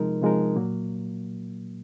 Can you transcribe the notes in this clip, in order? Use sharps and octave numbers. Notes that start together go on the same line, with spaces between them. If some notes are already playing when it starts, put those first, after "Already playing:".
Already playing: C3 F3 G#3 D#4 A#4
C3 F3 G#3 D#4 A#4
A#2 F#3 A#3